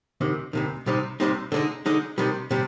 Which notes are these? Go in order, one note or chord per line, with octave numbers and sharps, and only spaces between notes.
D2 C3 D#3
D2 C3 D#3
C2 C3 G3 C4 D#4
C2 C3 G3 C4 D#4
D3 G#3 D#4
D3 G#3 D#4
C3 D#3 G3
C3 G3